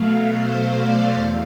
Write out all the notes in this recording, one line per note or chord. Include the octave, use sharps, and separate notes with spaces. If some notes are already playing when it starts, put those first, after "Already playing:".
Already playing: B2 F#3 A3 F5
C5
D5
E2